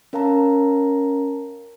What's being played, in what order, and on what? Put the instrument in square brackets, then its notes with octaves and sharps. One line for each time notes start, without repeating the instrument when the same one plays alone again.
[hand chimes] C#4 A#4 F5 A5 A#5